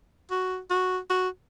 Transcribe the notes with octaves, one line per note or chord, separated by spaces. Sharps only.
F#4
F#4
F#4